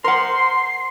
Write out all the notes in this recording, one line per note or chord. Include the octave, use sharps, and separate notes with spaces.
A#4 C5 F#5 C6 C7